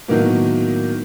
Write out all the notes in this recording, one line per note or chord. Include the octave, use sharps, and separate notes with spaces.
A2 D#3 F#3 A#3 B3